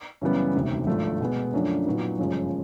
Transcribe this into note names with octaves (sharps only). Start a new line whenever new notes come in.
F#2 C#3 E3 G3 B3
E1 D2 C3 D#3
G#1 G2 D3 F3 A3
B2 G#3 B3
F#2 D3 F3 A3 D4
A#2 F#3 B3 D#4
G1 F#2 C#3 F3 G#3